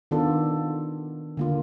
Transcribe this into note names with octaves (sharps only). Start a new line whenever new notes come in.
D#3 B3 D4 F4 A4
D3 A#3 F4